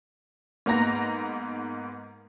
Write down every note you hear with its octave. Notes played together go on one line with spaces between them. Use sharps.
G#2 A#3 B3 A#5 A#6